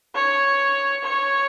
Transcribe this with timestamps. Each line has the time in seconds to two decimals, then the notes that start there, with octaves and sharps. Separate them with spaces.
0.15 C#5
1.04 C#5